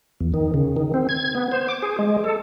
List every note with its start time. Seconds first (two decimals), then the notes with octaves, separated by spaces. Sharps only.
0.21 E2
0.34 D#3
0.54 C#3
0.76 D#3
0.94 C4
1.09 G#6
1.35 B3
1.52 C5
1.68 D6
1.82 G#4
1.99 G#3
2.24 A4